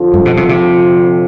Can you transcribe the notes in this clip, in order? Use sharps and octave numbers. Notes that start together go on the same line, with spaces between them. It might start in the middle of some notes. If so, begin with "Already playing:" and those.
Already playing: F2 D3 F3
G2
B2
C3
C3